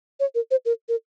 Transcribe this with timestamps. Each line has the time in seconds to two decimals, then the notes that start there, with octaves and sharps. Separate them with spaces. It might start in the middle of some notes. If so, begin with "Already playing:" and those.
0.20 C#5
0.35 A#4
0.51 C5
0.66 A#4
0.89 A#4